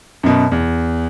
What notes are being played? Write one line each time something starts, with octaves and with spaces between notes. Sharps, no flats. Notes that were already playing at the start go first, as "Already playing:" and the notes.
F#2 B2
E2